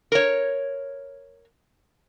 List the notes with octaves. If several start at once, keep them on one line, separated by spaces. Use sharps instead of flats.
A#4 C#5